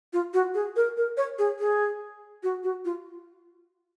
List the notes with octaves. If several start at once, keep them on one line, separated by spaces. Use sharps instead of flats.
F4
F#4
G#4
A#4
A#4
C#5
G#4
G#4
F#4
F#4
F4